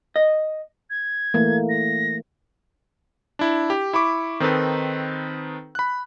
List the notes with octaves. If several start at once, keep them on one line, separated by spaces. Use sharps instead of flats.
D#5
G#6
E3 A3 A#3
A#6
D4 E4
G4
E4 B5 C#6 D6
D#3 C4 D#4 A4 B4
B5 F#6